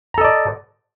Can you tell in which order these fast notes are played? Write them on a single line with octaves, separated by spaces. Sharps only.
A#5 A4 D#5 D5